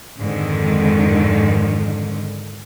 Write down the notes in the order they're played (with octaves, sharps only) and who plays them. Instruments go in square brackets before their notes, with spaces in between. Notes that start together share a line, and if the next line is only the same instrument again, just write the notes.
[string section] F2 G#2 D3 D#3